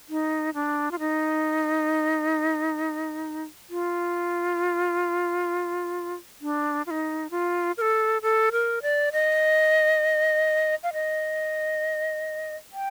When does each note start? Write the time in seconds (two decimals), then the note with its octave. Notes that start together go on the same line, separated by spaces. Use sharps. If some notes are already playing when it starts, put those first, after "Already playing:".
0.09 D#4
0.54 D4
0.91 F4
0.99 D#4
3.70 F4
6.42 D4
6.86 F4
6.91 D#4
7.31 F4
7.77 A#4
7.81 A4
8.22 A4
8.52 A#4
8.82 D5
9.12 D#5
10.83 F5
10.93 D#5
12.73 G5